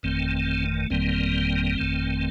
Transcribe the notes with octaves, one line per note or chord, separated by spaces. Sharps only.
G1 F2 D#3 A3 C4
G1 F2 D#3 G3 A#3 C4
G1 F2 D#3 A3